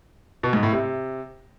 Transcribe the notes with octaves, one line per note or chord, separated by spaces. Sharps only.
B2
G#2
A2
C3